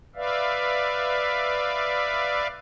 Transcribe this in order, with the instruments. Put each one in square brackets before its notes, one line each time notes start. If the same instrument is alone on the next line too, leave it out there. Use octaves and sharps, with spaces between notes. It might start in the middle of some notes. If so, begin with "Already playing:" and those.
[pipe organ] B4 D5 E5 F5